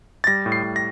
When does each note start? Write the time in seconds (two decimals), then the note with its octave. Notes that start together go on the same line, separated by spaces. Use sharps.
0.24 A6
0.27 G3 A#6
0.46 A2
0.52 C7
0.63 A2
0.76 A#6